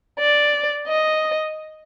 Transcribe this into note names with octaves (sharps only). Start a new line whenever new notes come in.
D5
D#5